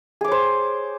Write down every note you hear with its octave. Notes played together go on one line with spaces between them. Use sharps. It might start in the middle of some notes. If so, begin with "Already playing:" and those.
G#4 C5 C#5 D6